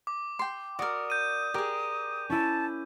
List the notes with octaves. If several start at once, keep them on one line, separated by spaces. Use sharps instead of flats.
D6
G5 C6
F#4 A#4 D5 D#6
G6 D#7
G4 G#4 A#4 D6
C#4 E4 A5